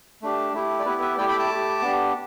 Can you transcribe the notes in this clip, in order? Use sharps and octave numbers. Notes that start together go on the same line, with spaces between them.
A3 D4 G4
A3 E4 G4
D5
B3 E4 G4 B4
B4 E5
A3 E4 G4 D5 G5
G5 B5
A5 D6
A3 G4
B3 D4 G4